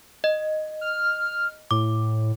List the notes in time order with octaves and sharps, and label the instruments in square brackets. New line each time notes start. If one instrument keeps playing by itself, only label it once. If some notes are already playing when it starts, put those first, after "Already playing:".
[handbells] D#5
[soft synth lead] F6
[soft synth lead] A2 [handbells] D6